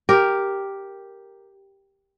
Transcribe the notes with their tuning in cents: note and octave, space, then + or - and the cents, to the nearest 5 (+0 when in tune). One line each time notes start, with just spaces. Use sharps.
G4 +0 A#4 +0